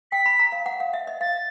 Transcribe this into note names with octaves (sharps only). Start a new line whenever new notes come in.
G5 B6
B5
A#5
F5
F#5
F5
E5
D#5
F5 A6